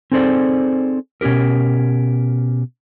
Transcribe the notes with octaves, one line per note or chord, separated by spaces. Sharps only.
C4 D#4 G#4 A4 C5 D5
B2 C#4 F4 G4 A#4